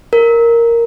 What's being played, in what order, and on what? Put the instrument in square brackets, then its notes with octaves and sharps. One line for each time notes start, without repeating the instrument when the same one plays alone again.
[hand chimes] A#4